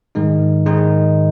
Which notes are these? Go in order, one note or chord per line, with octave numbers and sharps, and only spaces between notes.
G#2 D#3 G#3 D#4
G#2 D#3 G#3 D#4